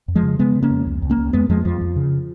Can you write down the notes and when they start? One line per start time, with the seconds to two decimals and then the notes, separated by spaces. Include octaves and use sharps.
0.08 F2
0.15 F3 G#3
0.23 C#3
0.39 C#3 G#3 B3
0.55 C#3
0.63 A#3 C#4
0.71 F2
0.86 C#2
1.02 C#2
1.10 A#3 C#4
1.18 C#2
1.33 F2 G#3 B3
1.49 F2 F3 G#3
1.65 F2 F3
1.81 F2
1.96 C#3